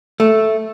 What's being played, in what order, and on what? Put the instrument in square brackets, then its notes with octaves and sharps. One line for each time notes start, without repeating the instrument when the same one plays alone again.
[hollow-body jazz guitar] A3